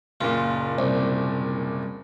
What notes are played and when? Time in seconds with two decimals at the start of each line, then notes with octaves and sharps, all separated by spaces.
0.21 F#1 A#2 F4
0.78 C2